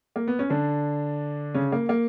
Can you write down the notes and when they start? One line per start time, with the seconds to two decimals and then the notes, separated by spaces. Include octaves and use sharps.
0.16 A#3
0.28 B3
0.39 C#4
0.50 D3 D4
1.54 C#3 C#4
1.72 A#3
1.89 A#3